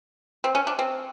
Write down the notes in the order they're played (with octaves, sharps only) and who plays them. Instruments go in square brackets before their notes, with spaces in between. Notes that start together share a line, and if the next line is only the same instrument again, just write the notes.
[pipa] C4
C#4
D4
C4